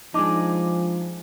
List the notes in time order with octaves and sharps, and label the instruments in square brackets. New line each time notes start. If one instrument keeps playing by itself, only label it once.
[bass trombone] F3 [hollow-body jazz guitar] G#3 D4 D#4 [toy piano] A5 D6